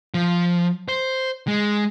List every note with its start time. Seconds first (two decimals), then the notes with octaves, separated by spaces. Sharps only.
0.14 F3
0.89 C5
1.48 G#3